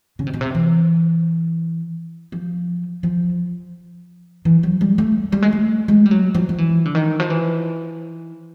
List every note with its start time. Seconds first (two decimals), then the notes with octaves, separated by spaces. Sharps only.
0.19 C#3
0.27 C3
0.34 B2
0.41 C3
0.55 E3
2.32 F3
3.03 F3
4.45 E3
4.63 F#3
4.81 G3
4.98 A3
5.32 G3
5.42 G#3
5.53 A3
5.88 G#3
6.06 G3
6.11 F#3
6.35 F3
6.49 F3
6.58 E3
6.85 D3
6.95 D#3
7.20 F3
7.30 E3